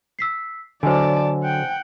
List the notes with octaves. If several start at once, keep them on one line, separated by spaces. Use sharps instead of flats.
E6 B6 C7
D3 F#3 C5 D5 D#5 G#5 A5
F#5 G5